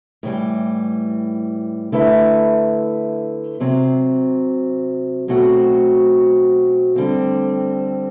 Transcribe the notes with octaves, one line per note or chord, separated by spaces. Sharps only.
A2 E3 G3
D3 A3 E4 B4 E5
C3 F#3 C4
B2 F#3 A3 C4 F#4
D2 D3 G3 C4